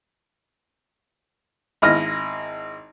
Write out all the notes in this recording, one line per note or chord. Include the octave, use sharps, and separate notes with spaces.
G#1 E4 D#5 F6